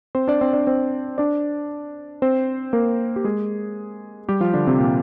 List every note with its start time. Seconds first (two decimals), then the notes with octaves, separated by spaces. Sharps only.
0.15 C4 C5
0.28 D4 D5
0.41 C4 C5
0.53 D4 D5
0.67 C4 C5
1.18 D4 D5
2.22 C4 C5
2.73 A#3 A#4
3.16 G4
3.24 G#3 G#4
4.29 G3 G4
4.40 F3 F4
4.54 D3 D4
4.67 C3 C4
4.79 A#2 A#3